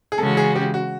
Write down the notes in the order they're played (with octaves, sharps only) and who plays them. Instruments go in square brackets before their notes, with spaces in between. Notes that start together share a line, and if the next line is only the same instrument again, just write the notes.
[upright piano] G#4
[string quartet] C#3 E3 G#3 C#4 F#4 [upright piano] A4
[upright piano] G#4
G4
F#4